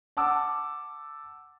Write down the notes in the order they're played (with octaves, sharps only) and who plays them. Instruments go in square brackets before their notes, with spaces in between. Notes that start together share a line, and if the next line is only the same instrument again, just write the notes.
[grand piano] F#5 A5 D6 E6